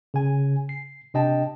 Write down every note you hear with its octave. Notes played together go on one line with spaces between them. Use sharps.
C#3 G#5
C7
C3 D4 D#5 G5 A5